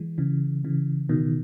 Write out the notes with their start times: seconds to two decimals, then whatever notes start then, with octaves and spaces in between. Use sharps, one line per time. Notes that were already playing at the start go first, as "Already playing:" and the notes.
Already playing: E3 G#3
0.18 C#3 E3
0.64 C#3 E3
1.09 B2 D#3